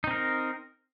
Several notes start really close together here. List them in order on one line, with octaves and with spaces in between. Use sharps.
D#4 C4 A#4